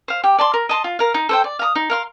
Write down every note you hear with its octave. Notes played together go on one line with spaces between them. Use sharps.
C5 F5
G4
D5 A5 C6
A#4
D#5 A5 C6
F4
A#4 F5
D#4
A4 C5 G5
D5
F5 A#5 D#6
D#4
A#4 F5 C6